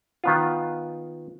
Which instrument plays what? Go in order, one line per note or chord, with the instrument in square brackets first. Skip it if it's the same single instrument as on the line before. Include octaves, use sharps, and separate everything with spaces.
[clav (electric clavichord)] D#3 B3 F4